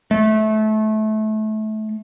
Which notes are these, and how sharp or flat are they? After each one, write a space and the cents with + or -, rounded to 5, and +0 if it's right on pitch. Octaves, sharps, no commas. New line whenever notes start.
A3 -25